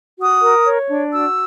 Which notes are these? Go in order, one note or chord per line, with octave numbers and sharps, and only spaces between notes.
F#4 D#6
A#4
C#5
D4
F#4 E6